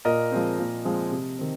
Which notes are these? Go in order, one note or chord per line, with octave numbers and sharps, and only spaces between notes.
A#2 A#4 D#5
F3 G#3 C4
A#2
F3 G#3 C4
C3
D#3 C4